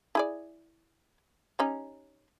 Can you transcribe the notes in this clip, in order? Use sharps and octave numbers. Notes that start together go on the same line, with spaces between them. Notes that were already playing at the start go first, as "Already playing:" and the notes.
E4 G#4 D5
G3 C#4 D#4